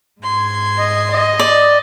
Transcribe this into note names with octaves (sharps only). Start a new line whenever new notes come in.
G#2 C6 G#6
D#5
D#5
D5